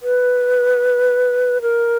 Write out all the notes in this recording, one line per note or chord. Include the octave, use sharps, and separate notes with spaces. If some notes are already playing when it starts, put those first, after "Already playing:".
B4
A#4